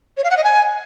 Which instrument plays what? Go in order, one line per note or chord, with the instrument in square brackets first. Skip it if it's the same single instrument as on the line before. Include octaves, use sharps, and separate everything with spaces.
[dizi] C#5
F5
F#5
D#5
G#5